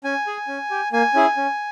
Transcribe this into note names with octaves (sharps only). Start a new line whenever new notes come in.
C#4 G#5
G#4
C#4
G4
A#3 G#5
C#4 E4 G#4
C#4